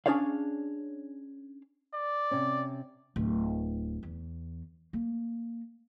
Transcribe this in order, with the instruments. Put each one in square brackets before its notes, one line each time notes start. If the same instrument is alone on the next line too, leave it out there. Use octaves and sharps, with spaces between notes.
[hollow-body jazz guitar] C#4 D4 G#4 C#5 D5 F5
[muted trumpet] D5
[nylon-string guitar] C3 C#4
[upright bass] D1
E2
A#3